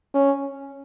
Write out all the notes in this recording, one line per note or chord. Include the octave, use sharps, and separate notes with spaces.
C#4